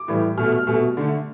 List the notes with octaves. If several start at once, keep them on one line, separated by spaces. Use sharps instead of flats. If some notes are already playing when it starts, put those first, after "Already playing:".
Already playing: D6
A2 E3 G3
B2 A3 F6
F6
B2 A3
D3 A3